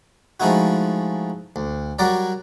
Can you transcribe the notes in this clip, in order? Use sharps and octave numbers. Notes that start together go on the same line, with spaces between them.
F3 G#3 A3 D#4 E4 F#4
D2
F#3 G3 F#4 A#4 D5